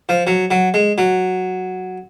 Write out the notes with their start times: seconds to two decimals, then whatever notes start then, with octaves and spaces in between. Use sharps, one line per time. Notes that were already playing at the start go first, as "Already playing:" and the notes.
0.09 F3
0.27 F#3
0.51 F#3
0.74 G#3
0.98 F#3